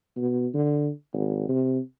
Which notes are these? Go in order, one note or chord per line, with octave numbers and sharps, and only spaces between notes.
B2
D3
G#1
C3